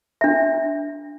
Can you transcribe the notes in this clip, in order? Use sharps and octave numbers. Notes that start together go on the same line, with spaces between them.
D4 E5